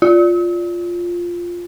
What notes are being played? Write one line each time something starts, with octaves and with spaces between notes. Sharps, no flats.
F4